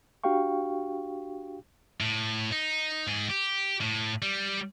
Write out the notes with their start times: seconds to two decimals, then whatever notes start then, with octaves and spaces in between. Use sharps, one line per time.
0.24 D4 F#4 G4 F5 G5 C#6
2.01 A2
2.52 D#4
3.07 G#2 G#4
3.29 G4
3.81 A2
4.22 G3